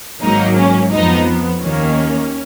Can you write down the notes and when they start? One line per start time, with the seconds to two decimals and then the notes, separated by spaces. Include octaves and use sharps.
0.21 G#1 G#2 F#3 A#3 D#4
0.56 C#4
0.91 F2 F3 B3 D#4
1.61 D#2 D#3 A#3 C#4